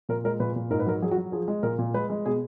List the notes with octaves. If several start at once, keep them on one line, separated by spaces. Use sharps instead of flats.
A#2 A#4
G#3 A#4
A#2 B4
A#2
G#2 A#4
B4
F#3 A#4
F#3 G#4
F#4
F#3
F3 G#4
G#3
A#2 A#4
A#2
G#3 B4
G#3
B2 G#4